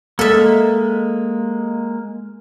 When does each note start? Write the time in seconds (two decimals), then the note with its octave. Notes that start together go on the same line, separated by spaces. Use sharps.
0.19 G#3 A#3 A4 E5